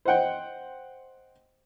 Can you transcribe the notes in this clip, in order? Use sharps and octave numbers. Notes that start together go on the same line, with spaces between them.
C5 D#5 F#5 G5